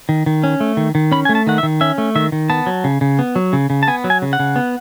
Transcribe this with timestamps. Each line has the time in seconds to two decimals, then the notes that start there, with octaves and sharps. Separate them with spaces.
0.09 D#3
0.26 D#3
0.44 C#4
0.60 A3
0.77 D#3
0.95 D#3
1.12 C#4 B5
1.25 A3 G#5
1.35 A5
1.47 D#3 F#5
1.58 E5
1.63 D#3
1.81 C#4 E5
1.98 A3
2.15 D#3 E5
2.32 D#3
2.50 B3 A5
2.66 F#3
2.84 C#3
3.01 C#3
3.19 B3
3.36 F#3
3.53 C#3
3.70 C#3
3.83 A5
3.88 B3 G#5
4.04 F#3
4.10 G#5
4.22 C#3
4.33 F#5
4.39 C#3
4.56 B3